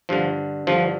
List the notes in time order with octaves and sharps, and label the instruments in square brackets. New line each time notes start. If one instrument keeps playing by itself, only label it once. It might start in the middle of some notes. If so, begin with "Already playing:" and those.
[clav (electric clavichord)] G2 D3 F3
G2 F3
D3